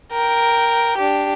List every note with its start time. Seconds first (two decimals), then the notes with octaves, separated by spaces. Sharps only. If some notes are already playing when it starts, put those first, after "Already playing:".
0.13 A#4 G5
0.97 D4 G4